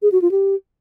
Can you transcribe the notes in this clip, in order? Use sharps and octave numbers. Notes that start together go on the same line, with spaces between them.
G#4
F#4
F4
G4